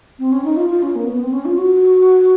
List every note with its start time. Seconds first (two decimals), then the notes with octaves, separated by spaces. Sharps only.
0.19 C4
0.32 C#4
0.44 D#4
0.57 F4
0.69 F4
0.83 C#4
0.96 A#3
1.05 B3
1.15 B3
1.23 C4
1.33 C#4
1.45 F4
1.58 F#4